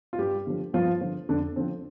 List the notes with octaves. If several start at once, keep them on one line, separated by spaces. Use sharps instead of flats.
F4
G2 G3 G4
D3 F3
G2 F3 F4
D3 F3
F2 D3 D4
D3 F3 C4